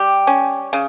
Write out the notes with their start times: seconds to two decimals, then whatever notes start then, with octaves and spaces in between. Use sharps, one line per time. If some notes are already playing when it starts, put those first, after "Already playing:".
Already playing: G3 G4
0.27 C#4
0.73 C#3